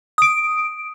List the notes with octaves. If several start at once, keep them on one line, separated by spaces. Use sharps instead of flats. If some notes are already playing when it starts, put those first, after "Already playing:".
D#6 D7